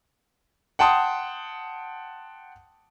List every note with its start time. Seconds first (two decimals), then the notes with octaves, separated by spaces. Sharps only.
0.79 F#5 G5 A5 C6 D#6